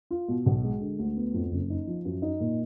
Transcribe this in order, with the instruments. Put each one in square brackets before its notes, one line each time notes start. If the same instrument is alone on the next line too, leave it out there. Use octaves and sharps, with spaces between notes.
[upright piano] F4
B2
B1
G#3
D3
D2
B3
F2
F#1
D#4
F3
F#2
D#4
A#2